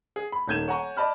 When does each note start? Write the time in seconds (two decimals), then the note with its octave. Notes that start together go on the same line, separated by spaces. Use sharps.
0.16 G#4
0.32 B5
0.48 D#1 D#3 G6 G#6 D#7 E7
0.68 C#5 F#5 G#5 A#5 C#6
0.97 D5 D#5 A5 B5 F6